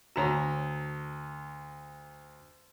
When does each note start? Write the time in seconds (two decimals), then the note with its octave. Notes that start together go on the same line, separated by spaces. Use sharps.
0.16 D2 F#4 C#5 A#5